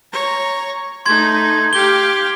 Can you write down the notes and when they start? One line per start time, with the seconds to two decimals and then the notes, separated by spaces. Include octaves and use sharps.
0.12 C#5 A#5
1.06 A3 D#4 C6 G#6
1.73 G4 F5 G7